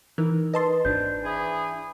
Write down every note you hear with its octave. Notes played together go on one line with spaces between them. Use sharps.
E3 D#4 A#4
B4 D#5 A5 C6
G#1 D4 B4 C5 G6
E3 G#4 B5